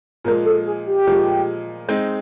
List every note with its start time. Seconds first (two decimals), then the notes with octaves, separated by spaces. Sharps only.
0.24 A#2 F3 G#3 A#4
0.45 A4
0.66 G#4
0.87 G4
1.07 A#2 F3 G#3
1.89 G#3 C4 D#4